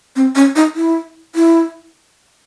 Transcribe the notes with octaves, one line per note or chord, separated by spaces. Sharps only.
C4
C#4
D#4
E4
E4